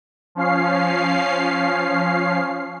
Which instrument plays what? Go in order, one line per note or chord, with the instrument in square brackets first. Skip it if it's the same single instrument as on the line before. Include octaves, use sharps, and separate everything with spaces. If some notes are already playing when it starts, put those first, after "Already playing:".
[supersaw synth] F3 C#4 F5 C7